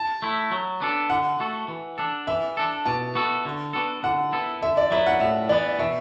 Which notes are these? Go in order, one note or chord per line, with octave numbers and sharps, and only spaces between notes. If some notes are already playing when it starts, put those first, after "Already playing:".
Already playing: A5
A3 E4
F#3
B3 D4 A4
D3 F#5
A3 F#4 A4
E3
D4 A4
E3 E5
D4 A4
B2 A5
B3 F#4 A4
D3
B3 D4 F#4 A4
D3 F#5
B3 E4 A4
D3 E5
D5
F#3 B3 E4 E5
F#5
A2 E5
E3 B3 D5
B2 E5